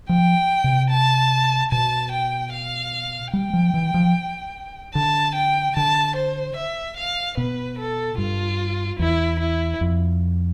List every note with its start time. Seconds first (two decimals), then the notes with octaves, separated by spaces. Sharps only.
0.09 F3 G5
0.64 C3
0.90 A5
1.72 B2 A5
2.12 G5
2.53 F5
3.33 G3 G5
3.53 F3
3.74 E3
3.94 F3
4.95 D3 A5
5.35 G5
5.77 D3 A5
6.16 C5
6.57 E5
6.97 F5
7.37 B2 B4
7.79 A4
8.18 G2 F4
8.99 E2 E4
9.40 E4
9.81 F2